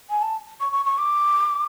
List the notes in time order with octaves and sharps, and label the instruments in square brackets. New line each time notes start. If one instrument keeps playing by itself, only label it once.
[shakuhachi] G#5
A5
C#6
C#6
C#6
D6